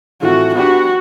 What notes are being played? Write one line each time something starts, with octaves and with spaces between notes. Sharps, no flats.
A2 E3 A3 C4 F4 F#4
B3 D4 F#4 G4